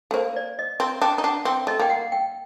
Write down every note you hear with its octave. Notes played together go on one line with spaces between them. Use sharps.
A3
A#3 C5
D5
D#5
C4
D4 G5
D#4
D4 F#5
C4 G5
A3 D#5
A#3 G5
F#5
G5